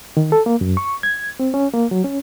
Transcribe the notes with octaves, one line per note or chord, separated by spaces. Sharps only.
D#3
A4
A#3
F#2
C#6
G#6
C4
C#4
A#3
F#3
C#4